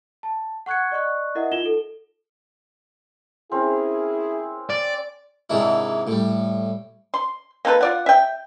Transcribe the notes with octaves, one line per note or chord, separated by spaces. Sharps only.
A5
F#5 C#6 F#6 G#6 C#7
D5 D#5 C#6 F#6
E4 A#4 D#5 E5 F#5
D#4 F4 E7 G7
A4
C4 C#4 E4 G#4 A#4
D5
G#2 C3 D#3 G#3 D4 E4
A2 G3
C6
A#3 D#4 A4 B4
F4 D5 F#5
E5 G5